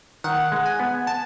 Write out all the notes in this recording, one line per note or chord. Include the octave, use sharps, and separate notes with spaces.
D#3 F#5
G#3
G#5
B3
A5